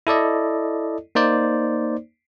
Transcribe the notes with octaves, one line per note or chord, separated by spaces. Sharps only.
E4 A4 D5 D#5
A#3 D#4 C5 D5